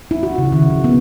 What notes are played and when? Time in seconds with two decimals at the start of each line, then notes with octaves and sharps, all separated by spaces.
0.11 E4
0.23 F#4
0.38 C#3
0.53 D#3
0.70 F3
0.84 B3